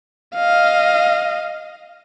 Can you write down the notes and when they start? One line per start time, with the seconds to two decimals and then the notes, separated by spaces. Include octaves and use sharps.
0.35 D#5 F5